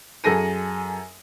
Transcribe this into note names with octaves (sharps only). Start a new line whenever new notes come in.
F#2 G#4 A4 G#5 A#6 D#7